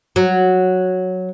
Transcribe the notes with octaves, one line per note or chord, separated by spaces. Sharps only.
F#3